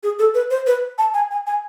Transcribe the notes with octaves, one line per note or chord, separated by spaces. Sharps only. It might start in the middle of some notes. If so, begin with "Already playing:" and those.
G#4
A4
B4
C5
B4
A5
G#5
G#5
G#5